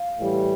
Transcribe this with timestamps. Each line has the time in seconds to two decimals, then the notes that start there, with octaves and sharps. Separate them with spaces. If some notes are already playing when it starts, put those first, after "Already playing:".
Already playing: F5
0.19 A2 E3 G3